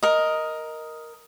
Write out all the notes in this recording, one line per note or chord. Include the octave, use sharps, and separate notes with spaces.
A#4 D#5